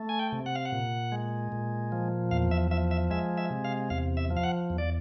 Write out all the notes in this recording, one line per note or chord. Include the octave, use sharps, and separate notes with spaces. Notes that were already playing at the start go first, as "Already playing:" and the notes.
Already playing: A3
G#5
G5
C3
F#5
F5
F#5
A#2
G#3
A#2
F3
E2 F5
E5
F3 E5
E5
G#3 E5
E5
C3
F5
E2 F5
E5
F3
F5
F#5
E2
D5